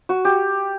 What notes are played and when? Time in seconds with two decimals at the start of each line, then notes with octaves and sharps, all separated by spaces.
0.09 F#4
0.25 G4